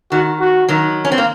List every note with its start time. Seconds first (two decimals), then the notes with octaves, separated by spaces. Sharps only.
0.12 D#3 F#4
0.40 F#4
0.69 D#3 F#3
1.05 C#4
1.12 C4
1.18 A#3